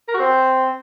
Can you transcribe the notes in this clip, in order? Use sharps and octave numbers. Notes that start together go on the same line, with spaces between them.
A#4
F#4
C4